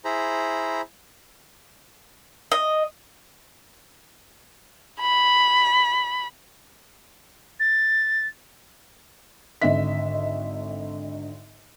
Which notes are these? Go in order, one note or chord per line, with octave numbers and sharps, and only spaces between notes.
E4 G#4 C5 A#5 B5
D#5
B5
A6
G#1 D3 D#5 E5 B6